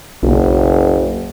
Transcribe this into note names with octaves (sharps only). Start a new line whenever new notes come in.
F#1 B1